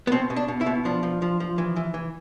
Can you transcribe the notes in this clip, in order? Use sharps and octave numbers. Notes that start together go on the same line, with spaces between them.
B3
B2 C4
B2
D4
B2
E4
B2
F3 D4
F3
F3
F3
E3
E3
E3